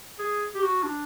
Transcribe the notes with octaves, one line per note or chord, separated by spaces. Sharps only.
G#4
G4
F#4
D4